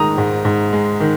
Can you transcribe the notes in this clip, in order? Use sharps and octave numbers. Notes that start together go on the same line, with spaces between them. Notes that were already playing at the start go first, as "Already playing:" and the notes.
Already playing: G#2 D#3 G#3 A#5 D#6
G#2
G#2
G#3
D#3